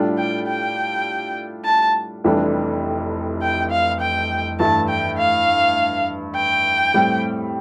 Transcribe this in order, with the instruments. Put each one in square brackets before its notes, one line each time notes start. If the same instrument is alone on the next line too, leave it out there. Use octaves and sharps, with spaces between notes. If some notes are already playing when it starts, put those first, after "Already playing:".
Already playing: [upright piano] A2 G3 D4 F4 A4
[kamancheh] G5
G5
A5
[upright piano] F1 F2 E3 G3 D4
[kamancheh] G5
F5
G5
[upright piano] G2 E3 A3 E4 [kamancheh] A5
[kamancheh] G5
F5
G5
[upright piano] A2 G3 C4